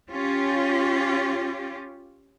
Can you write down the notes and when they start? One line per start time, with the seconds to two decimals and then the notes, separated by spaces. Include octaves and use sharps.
0.11 C#4 F4 G4